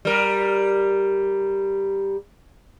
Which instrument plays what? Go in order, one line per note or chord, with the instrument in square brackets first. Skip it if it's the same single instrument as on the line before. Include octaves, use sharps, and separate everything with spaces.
[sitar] G3 A#4